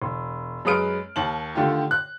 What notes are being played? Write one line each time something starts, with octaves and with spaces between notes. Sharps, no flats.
E1
F#2 G#3 B4 D#6 F6 D7
D#2 A5 F#7
D3 D#3 A3 F4 G4
F#6